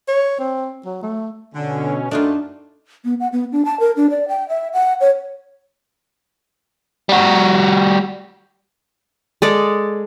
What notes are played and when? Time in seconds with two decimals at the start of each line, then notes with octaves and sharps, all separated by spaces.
0.08 C#5
0.39 C4
0.85 F#3
1.03 A3
1.55 B2 D3 C#4
2.11 F#2 A3 D4 D#4 F4
3.05 B3
3.20 F#5
3.33 B3
3.52 D4
3.65 A5
3.80 A#4
3.97 D4
4.10 D5
4.28 G5
4.49 E5
4.73 F#5
5.01 C#5
7.09 G3 F#4
9.42 G#3 A4 D5